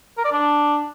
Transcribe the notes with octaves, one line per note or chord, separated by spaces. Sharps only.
A#4
D5
D4